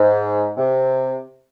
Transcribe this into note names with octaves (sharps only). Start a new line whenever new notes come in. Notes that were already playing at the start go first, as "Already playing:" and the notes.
Already playing: G#2
C3